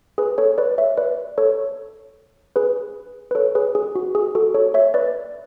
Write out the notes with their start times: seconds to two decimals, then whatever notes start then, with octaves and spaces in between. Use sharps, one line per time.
0.18 G#4 B4
0.38 A4 C#5
0.58 B4 D5
0.78 C#5 E5
0.97 B4 D5
1.38 A4 C#5
2.56 G#4 B4
3.31 B4
3.35 A4 C#5
3.55 G#4 B4
3.75 G#4
3.95 F#4
4.15 G#4
4.35 F#4 A4
4.55 A4 C#5
4.74 C#5 E5
4.94 B4 D5